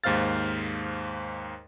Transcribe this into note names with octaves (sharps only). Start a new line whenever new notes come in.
D#2 G#2 C5 F5 F6 A6